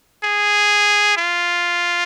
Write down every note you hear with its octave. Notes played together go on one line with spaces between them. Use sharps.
G#4
F4